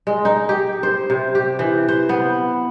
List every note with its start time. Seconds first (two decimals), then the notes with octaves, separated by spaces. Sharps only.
0.07 G#3
0.25 D#4
0.49 G4
0.83 C5
1.10 C3
1.35 G4
1.59 E3
1.88 C5
2.09 B3